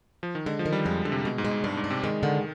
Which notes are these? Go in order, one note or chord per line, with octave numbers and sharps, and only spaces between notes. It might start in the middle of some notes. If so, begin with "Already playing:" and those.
F3
D#3
D3 G#3
F3
D#3
G3
F2 G#3
F2 D3
C3
B2 G#3
G#2
G#3
G#2
G2 D4
G#2
D4
C3
D#3 G#3
D3 D#3